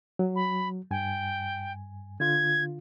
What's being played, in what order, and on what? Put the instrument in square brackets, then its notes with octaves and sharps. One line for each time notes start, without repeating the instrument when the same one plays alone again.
[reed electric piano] F#3
[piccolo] B5
[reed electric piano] G2 G#5 [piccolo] G5
[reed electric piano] D3 F4 [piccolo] G#6